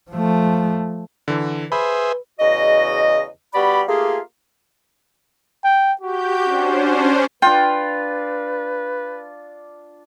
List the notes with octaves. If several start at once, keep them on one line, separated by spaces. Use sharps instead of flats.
F3 A3
D3 E3
G#4 B4 C5 E5 B5
E2 C#3 F#4 D#5
G3 B3 F#4 G4 D5 B5
A3 A#3 F4 G4 G#4
G5
F#4 G4 G6
C#4 D4 C5
F#4
D4 F4 B4 G5